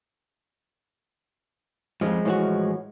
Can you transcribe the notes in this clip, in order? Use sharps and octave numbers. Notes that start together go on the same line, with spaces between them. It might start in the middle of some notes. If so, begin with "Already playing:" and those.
F2 G#2 F3 G#3
A2 E3 F#4